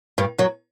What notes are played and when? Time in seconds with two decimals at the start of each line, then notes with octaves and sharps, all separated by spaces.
0.18 G2 G3
0.38 F#2 F#3